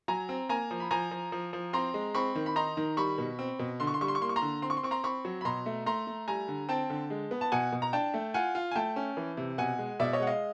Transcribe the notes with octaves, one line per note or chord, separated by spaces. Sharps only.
F#3 G#5 A#5
C4
A#3 G#5 A#5
F3
B5
F3 G#5 A#5
F3
F3
F3
C4 A#5 C6
G#3
C4 B5 C#6
D#3
B5
D#4 A#5 C6
D#3
G3 B5 C#6
B2
C4
B2
D3 C6
C#6
C6
G3 C#6
C6
C#6
A#3 C6
C#6
A#5 C6
D3
C4 C6
C#6
C6
C4 C#6
A#5 C6
C4 B5 C#6
F#3
B5
B2 A#5 C6
A3
A3 A#5 C6
A3
G3 G#5 A#5
D3
C4 G5 A5
D3
G#3
B3
A5
B2 F#5 G#5
B2
A#5
D4 G5 A5
A3
F4 F#5 G#5
F4
G#5
A3 G5 A5
C#4
E3
C3
B2 F#5 G#5
G#3
B2 D5 E5
C#5 D#5
G#3 F#5
D#5 F5